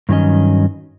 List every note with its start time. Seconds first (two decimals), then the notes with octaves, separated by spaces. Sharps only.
0.09 G2 D#3 F#3 C#4 D#5